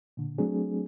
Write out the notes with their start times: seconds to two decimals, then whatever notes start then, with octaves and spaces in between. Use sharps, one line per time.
0.17 A#2 D3
0.38 F#3 A3 C4 D4 G#4